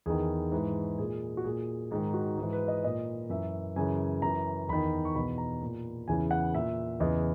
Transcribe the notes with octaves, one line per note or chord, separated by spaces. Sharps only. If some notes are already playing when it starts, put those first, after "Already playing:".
E2 D#3 G#4
G#2 E3
A#2 G#4
F#4
A#2 G#4
G#2 D#3 G#4
F#4
G#2 E3
B4
D#5
A#2 D#5
F#2 E3 E5
F#2 C#3 E3 G#5
F#2 E3 A#5
E2 D#3 B5
C#6
E2 B2 B5
A#5
A#2
E2 C#3 E3 G#5
F#5
A#2 E5
E2 C#3 E3 D#5